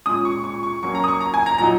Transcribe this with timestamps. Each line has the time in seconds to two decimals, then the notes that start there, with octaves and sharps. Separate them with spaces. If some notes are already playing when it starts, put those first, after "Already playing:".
0.06 A#2 G#3 C#4 D#6
0.25 C#6
0.44 C#6
0.63 C#6
0.83 F#3 A#3 C#4 C#6
0.95 A#5
1.04 D#6
1.08 C#6
1.21 A#5
1.34 G#5
1.46 A#5
1.58 A#2 F#3 D#4 A#5